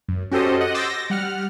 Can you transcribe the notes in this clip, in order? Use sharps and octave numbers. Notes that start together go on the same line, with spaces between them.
F#2
C#4 F#4 G4 A4 C5 D#5
D#5 F#5
C6 D6 E6 G6 A6 A#6
A#6
G3 F#5 F6